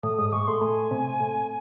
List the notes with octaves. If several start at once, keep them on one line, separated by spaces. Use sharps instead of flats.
A2 D#6
G#2 D#6
D#6
G#2 C#6
A2 C6
A2 G#5
C3
A2